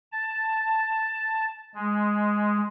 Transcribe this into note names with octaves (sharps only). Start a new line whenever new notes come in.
A5
G#3